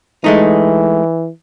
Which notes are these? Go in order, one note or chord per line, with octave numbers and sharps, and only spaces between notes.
E3 G#3 A3 D#4